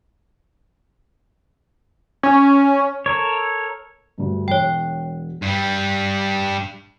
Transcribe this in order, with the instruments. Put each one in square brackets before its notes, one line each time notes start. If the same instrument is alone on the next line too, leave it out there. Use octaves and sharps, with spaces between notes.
[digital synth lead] C#4
[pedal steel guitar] A4 A#4 C#5
[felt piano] D2 G2
[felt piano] E1 [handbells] C#5 G5
[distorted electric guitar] G2 G3